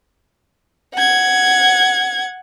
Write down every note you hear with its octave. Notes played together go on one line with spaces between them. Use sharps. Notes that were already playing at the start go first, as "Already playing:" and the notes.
F#5 G#6